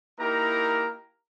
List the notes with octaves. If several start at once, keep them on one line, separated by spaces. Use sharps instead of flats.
A#3 D#4 E4 G4 A#4 A#5